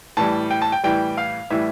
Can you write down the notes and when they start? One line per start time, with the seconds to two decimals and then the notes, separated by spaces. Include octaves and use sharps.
0.17 A2 E3 G3 A5
0.51 G5
0.62 A5
0.72 G5
0.83 A2 E3 G3 G5
1.18 F5
1.50 A2 E3 G3 E5